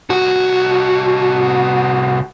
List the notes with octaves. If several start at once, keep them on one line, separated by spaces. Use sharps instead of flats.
C2 F#4